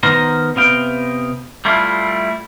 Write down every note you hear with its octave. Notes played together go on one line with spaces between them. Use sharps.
D#3 B3 A#4 C5 A#5
C3 B3 F5 G5
G3 A3 E4 F4